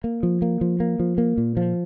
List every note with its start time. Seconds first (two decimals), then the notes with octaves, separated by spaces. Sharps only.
0.04 A#3
0.23 F3
0.42 A#3
0.61 F3
0.80 A#3
1.00 F3
1.18 A#3
1.38 A#2
1.57 F3